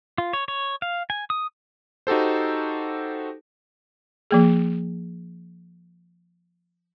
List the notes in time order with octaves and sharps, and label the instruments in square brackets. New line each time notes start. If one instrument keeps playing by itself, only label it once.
[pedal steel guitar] F4
C#5
C#5
F5
G#5
D#6
[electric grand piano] D#4 F#4 G4 A4 C5
[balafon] F3 A#3 G#4